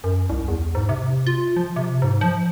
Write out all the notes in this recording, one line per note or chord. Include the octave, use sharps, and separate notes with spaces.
F#2
C2
E2
G#2
C3
F4
F3
C3
G#2
F3